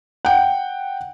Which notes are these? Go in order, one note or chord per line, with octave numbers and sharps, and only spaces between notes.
F#5 G5